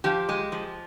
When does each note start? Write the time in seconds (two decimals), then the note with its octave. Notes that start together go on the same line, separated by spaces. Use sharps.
0.04 F3 G4
0.29 G#3
0.52 F3